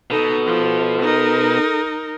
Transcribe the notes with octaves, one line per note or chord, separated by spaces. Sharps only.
B2 D#4 A4
F3
D#4 A#4